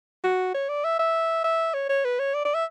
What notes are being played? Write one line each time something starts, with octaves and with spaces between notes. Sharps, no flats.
F#4
C#5
D5
E5
E5
E5
C#5
C#5
B4
C#5
D5
D5
E5